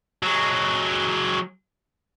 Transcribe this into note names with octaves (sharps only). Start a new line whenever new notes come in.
F#3 G#3